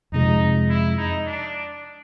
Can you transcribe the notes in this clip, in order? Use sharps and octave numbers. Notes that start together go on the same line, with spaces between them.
F2 C3 F3 G#3 D#4
E4
D#4
D4